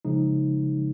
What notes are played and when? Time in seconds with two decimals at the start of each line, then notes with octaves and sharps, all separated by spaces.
0.05 C#3 F3 G#3 D#4